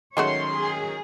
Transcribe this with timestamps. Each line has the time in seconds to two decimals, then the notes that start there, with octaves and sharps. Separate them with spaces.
0.17 D#3 F#3 G#3 A3 C#4 F#4 C#5 C6
0.52 G#4